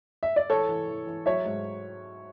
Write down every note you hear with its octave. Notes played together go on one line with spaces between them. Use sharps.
E5
D5
E3 A4 C#5
E3
E3
E3
F#3 C#5 E5
G#2